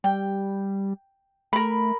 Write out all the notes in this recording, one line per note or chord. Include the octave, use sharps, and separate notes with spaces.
G3 G5
A3 A#4 B5